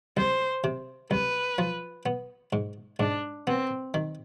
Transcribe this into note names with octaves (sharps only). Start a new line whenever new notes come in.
C2 C5
C3
C2 B4
F3
B3
G#2
G#2 D4
B3 C4
D#3